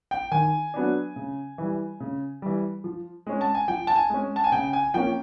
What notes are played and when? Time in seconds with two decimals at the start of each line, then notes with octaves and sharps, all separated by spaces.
0.11 G5
0.31 D#3 G#5
0.74 F#3 B3 D4
1.16 C#3
1.58 E3 G3
2.00 C#3
2.42 E3 G3
2.84 F3
3.27 G#3 C#4
3.41 A5
3.55 G#5
3.68 F3 G5
3.87 A5
3.96 G#5
4.10 G#3 C#4
4.36 A5
4.44 G#5
4.52 C#3 G5
4.73 G#5
4.94 F3 A#3 C#4 G5